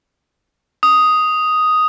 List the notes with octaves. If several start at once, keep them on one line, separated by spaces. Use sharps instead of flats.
D#6